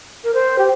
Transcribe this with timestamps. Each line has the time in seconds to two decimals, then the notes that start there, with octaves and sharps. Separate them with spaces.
0.24 A#4
0.34 C5
0.58 G4